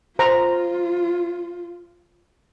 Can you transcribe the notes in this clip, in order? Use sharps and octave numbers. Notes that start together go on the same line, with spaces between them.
F4 C5 A#5